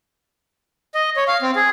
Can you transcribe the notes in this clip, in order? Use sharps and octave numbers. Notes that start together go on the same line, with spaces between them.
D#5
C#5
F5
C4
G#4